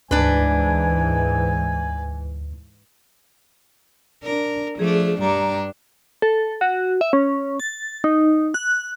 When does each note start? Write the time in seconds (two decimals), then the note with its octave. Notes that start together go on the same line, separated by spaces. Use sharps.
0.11 D2 G#2 E3 D4 B4 G#5
4.24 D4 A#4
4.79 F3 A3 D4 G#4
5.21 G2 G3 D4 A#5
6.22 A4
6.61 F#4
7.01 E5
7.13 C#4
7.60 A6
8.04 D#4
8.54 F#6